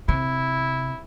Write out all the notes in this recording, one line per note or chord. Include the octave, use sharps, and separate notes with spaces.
C3 E4